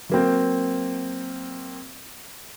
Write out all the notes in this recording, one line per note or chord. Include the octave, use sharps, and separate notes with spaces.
F#3 A#3 C4